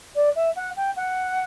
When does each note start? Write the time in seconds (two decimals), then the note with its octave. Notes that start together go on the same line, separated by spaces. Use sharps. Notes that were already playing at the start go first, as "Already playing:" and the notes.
0.15 D5
0.35 E5
0.55 F#5
0.76 G5
0.96 F#5